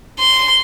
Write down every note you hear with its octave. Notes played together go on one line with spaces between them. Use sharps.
C6